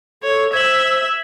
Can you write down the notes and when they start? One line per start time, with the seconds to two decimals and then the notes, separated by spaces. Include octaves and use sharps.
0.23 A4 C#5
0.53 C5 E5 G#6 F#7